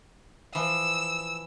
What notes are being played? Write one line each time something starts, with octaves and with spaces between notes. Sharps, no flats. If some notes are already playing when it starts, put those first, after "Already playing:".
E3 F3 E6